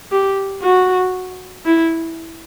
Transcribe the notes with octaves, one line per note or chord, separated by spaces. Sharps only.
G4
F#4
E4